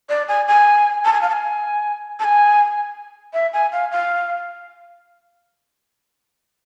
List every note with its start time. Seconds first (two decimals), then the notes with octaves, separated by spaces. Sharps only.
0.09 D5
0.28 G#5
0.48 G#5
1.05 A5
1.13 G#5
1.21 F5
1.29 A5
1.33 G#5
2.20 A5
2.24 G#5
3.33 E5
3.53 G#5
3.72 F5
3.91 F5